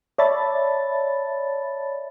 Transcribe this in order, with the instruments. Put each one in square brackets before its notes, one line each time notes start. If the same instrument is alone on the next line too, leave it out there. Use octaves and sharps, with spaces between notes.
[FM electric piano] C#5 D5 E5 A5 B5 A6